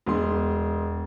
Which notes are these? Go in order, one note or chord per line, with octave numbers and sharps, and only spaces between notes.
E1 B3 C6